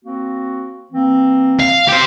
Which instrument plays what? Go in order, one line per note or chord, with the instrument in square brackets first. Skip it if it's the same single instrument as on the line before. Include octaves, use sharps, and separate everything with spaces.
[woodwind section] A#3 C4 F#4
E3 A#3 C4
[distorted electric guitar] F5
G4 C5